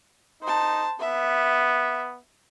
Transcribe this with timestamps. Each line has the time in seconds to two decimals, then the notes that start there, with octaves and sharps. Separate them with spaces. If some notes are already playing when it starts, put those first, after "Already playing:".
0.43 D#4 C5 A5
1.00 B3 E5